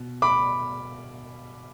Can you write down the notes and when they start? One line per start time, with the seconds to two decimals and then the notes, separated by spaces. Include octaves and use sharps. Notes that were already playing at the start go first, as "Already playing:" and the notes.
Already playing: B2
0.22 B5 D6